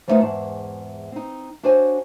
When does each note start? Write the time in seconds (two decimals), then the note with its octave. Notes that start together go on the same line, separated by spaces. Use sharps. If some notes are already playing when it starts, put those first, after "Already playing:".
0.08 F3 G3 A3 B3 D#4 F4
0.21 E2 G#2 A5
1.12 C4 D#4
1.63 D4 F#4 C5 C#5 G#5